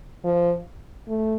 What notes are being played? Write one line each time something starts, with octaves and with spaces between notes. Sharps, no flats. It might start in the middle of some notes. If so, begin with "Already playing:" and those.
F3
A3